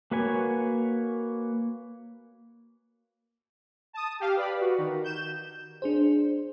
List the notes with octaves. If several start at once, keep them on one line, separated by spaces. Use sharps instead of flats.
A#3 F#4 B4 C#5 G#5
A5 D#6
G4 F5
B4 D5 B5
F#4
D#3
G6 E7
D4 G#4 C5